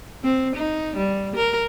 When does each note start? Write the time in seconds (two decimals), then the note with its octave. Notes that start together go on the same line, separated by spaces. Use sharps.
0.23 C4
0.56 D#4
0.96 G3
1.36 A#4